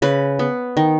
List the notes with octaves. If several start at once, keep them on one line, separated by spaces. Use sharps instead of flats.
C#3 B4
B3
D#3